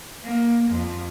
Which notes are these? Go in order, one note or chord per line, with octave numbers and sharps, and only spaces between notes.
A#3
F2